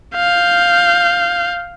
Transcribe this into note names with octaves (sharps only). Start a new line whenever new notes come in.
F5 G6